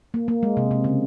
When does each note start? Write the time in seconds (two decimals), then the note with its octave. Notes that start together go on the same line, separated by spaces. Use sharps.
0.14 A#3
0.28 A#3
0.43 G#3
0.57 C3
0.71 C3
0.84 C#3